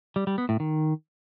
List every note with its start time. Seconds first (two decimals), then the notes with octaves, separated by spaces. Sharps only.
0.16 G3
0.27 G3
0.38 B3
0.49 A2
0.60 D#3